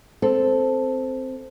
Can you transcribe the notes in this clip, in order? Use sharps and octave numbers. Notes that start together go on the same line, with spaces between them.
C4 A4